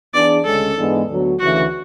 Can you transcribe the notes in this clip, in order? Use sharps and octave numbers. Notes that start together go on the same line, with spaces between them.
E3 B3 D4 G#4 D5
D2 C#3 G#3 C#4 A4
G#2 E3 G#3 B3 D4
D2 D3 F#3 B3
D2 C#3 E3 A3 F#4